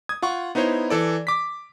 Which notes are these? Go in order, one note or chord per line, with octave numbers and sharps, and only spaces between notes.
D#6 G#6
F4 F#5 C#6
B3 D#4 E4 C5 C#5
E3 A4 D5
D6 B6